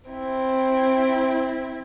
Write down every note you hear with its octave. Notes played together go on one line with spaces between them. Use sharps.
C4 E4